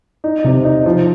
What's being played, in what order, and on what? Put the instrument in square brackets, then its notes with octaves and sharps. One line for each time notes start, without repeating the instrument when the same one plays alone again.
[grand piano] D#4
C3
D#4
F3